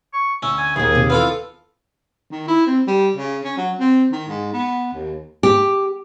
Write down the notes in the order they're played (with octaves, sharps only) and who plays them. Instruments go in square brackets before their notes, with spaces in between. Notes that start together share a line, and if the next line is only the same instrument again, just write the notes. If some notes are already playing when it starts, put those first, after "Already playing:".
[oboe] C#6
[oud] D2 [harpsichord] C#4 [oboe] E6
[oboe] G#5
[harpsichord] D#2 [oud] F3 A#3 [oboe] G#4
[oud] C3
[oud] E3 [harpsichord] B3 F4 A4 [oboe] F5
[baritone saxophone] D#3
E4
C4
G3
C#3
C#4
F#3
C4
D#3
G#2
B3
D#2
[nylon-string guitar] G4